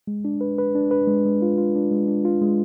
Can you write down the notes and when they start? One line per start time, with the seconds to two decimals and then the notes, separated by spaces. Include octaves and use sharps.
0.07 G#3
0.25 D4
0.41 B4
0.58 B4
0.75 D4
0.91 B4
1.08 G#3
1.25 G#3
1.42 F4
1.57 F4
1.75 D4
1.91 G#3
2.08 D4
2.25 F4
2.41 G#3